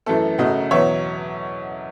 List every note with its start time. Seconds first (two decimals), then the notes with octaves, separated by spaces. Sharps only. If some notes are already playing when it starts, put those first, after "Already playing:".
0.06 F#2 E3 A3 A4
0.38 F#2 C#3 F#3 A3 D#5 F#5
0.71 E2 B2 F#3 C#5 E5